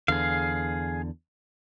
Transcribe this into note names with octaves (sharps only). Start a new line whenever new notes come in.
E2 D3 G#4 F5